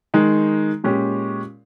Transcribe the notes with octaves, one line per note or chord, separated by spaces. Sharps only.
D#3 G#3 D#4
A#2 G#3 C#4 G4